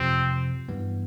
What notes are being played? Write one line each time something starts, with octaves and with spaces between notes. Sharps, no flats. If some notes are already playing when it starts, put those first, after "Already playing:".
Already playing: F2 C3 F3 C4
G2 E3 G3 B3